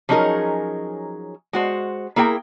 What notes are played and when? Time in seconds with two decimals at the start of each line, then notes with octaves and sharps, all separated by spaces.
0.09 F3 F#3 C#4 D#4 G#4 A#4
1.53 G#3 F#4 C5
2.16 A#3 E4 G#4 A#4 G5